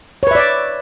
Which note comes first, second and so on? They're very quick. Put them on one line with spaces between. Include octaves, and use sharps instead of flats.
C#5 B4 E5 D5